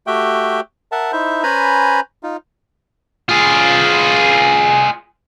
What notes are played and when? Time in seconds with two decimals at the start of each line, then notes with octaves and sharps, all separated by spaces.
0.07 A3 F#4 G4 E5 G5
0.92 A#4 E5 F#5 A5
1.12 D#4 E4 C5 E5
1.43 C#4 B4 C5 G#5 A#5 B5
2.23 D#4 F4
3.29 F4 G#4